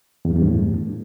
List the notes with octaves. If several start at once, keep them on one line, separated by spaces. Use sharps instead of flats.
E2
G2
E2
G2
A2